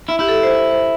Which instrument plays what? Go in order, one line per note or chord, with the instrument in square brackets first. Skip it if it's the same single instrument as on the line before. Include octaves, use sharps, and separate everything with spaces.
[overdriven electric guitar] E4
[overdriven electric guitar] E4 [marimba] G4
[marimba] A4
C5
C5
C5